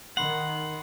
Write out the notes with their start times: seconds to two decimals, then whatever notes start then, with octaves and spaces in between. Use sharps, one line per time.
0.17 D#3 F#5 B5 C6 C7